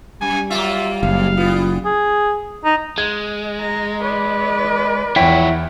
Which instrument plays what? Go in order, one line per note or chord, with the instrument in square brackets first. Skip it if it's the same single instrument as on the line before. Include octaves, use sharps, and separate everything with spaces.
[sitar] F#2 [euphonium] G3 [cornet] G#5
[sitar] F#3 A#3 F4 [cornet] E5
[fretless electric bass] F#1 [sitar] F2 [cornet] F5
[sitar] G3 B3 [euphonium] F4
[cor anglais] G#4
D#4
[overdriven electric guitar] G#3 [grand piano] G#6
[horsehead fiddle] A#5
B4 D5
[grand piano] E2 G5 [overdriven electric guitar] F3 C#5 [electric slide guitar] E4